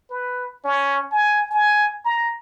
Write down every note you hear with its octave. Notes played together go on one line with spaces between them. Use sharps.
B4
C#4
G#5
G#5
A#5